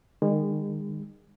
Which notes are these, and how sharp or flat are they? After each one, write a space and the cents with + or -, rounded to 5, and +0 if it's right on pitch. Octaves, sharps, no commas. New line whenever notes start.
D#3 -30 G#3 -40